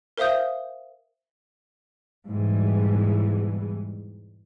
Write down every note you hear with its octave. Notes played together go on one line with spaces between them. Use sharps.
A#4 C5 E5 F5 D#6 G6
E2 G#2 B2 E3 G3